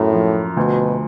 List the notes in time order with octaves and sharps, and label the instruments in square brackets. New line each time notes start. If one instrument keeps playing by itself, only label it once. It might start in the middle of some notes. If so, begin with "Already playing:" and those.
Already playing: [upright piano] F#2 [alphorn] A2
[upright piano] F3
[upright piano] D2 [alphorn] B2